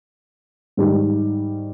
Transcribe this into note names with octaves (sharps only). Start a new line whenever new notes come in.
G#2 D#3 G3